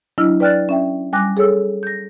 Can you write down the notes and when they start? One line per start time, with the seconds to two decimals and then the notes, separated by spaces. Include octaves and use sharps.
0.18 F#3 D4 E4 D#5 E6 F6
0.40 B4 D5 G5 F6 F#6 A6
0.69 C#4 E5 G5
1.13 G3 G5 G#5 D6 F#6 A#6
1.37 G#4 A4 C#5 E6
1.83 G6 A#6